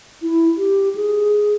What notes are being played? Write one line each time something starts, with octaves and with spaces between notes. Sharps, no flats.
E4
G4
G#4